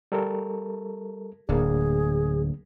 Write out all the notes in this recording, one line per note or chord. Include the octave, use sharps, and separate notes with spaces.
G3 A4 A#4
D1 A2 A#3 D4 G#4